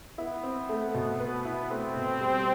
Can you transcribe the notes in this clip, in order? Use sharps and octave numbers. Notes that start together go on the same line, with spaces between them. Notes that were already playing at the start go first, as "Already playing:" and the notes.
B3 E4
C4
A3
B2
B4
E4
A3 C4
B2
G3